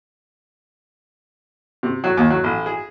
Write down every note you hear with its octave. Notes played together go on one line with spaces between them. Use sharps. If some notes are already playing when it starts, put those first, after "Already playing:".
C3
F#3
D#2
F#3
A1
G#4